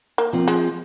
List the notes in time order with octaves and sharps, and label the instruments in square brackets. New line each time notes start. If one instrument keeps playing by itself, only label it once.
[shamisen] A#3
[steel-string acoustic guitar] F3 C4
[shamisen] G#3